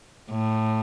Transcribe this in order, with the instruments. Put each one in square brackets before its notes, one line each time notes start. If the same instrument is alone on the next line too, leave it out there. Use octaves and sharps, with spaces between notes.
[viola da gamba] A2